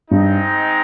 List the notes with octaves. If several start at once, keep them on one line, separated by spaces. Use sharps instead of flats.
G2 G#3 C4 D#4